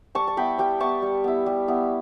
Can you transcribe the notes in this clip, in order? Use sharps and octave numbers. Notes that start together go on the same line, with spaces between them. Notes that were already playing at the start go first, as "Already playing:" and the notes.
G3 A5 C#6
A5
B3 E4 G5 B5
G3 G5 B5
B3 E4 A5 C#6
G3
B3 E4
G3
B3 E4